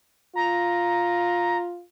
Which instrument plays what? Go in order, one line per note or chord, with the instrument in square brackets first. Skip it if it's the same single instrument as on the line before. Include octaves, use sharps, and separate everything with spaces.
[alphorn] F4 [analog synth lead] A#5